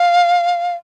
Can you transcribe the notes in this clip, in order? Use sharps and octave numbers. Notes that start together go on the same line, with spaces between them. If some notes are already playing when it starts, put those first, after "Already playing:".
Already playing: F5